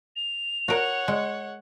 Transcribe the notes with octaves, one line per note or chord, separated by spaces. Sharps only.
F7
F#4 A#4 C#5 F#5
G#3